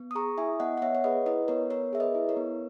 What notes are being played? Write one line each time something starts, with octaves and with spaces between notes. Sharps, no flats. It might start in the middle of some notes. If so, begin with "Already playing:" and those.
Already playing: B3
D#6
G#4 A#5 C#6
E4 E5 G#5
B3 D#5 F#5
F#5
B3 C#5 E5
C#5
G#4 B4 D#5
E4 B4 D#5
B3 A#4 C#5
B3 A#4 C#5
G#4 E5
B4 D#5
E4
A#4 C#5
B3